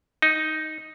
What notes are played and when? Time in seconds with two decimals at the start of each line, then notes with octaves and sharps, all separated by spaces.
0.22 D#4